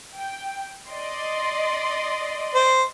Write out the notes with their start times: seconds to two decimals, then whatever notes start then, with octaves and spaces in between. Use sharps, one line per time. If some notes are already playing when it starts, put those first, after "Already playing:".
0.15 G5
0.89 D5 D#5 C6
2.54 C5